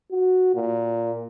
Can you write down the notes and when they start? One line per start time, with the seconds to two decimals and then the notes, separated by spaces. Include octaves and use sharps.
0.11 F#4
0.55 A#2